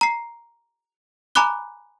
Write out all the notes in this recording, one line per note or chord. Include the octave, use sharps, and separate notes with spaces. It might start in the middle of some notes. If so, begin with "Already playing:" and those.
A#5 C7
G#5 A#5 B5 D6 F#6 G7